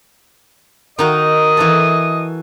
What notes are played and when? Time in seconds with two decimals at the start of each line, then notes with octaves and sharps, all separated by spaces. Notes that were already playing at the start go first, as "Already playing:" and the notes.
0.99 D#3 D#4 F#4 D#5
1.57 E3 F#4 A4